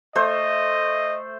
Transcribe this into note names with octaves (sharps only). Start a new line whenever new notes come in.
A3 C5 D#5